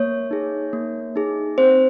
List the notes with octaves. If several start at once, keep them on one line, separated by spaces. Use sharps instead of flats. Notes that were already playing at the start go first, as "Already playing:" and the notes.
Already playing: A#3 C#5
D#4 G#4
A#3
D#4 G#4
C4 C5